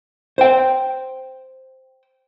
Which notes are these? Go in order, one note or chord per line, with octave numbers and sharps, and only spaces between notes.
C5 G5